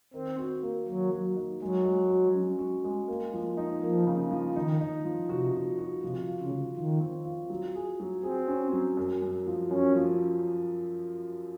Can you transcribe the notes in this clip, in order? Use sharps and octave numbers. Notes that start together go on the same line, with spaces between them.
D#3 C4
F#4
A#3
D#3 F#3
F#4
D#4
F#3 G#3
G#3
F#4
C#4
F#4
G#3
A#3
F3
D#4
F3 A#3
C#3
F3
D#3 D#4
D#4
F3
C3 F#4
F#4
F#4
C3 F3
F4
C#3
F3
D#3 F4
C4
F4
F#3
G#4
F#3
C4 G#4
C#4
F#3
F#2
F#2
F3
F#2 C#4
F3